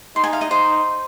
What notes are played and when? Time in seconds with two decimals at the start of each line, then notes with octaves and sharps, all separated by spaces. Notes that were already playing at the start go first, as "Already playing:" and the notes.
0.16 D#4 C6
0.24 G#5
0.33 F5
0.41 D#5
0.50 D#4 C5